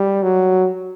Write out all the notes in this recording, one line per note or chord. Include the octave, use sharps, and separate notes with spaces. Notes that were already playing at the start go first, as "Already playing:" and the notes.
Already playing: G3
F#3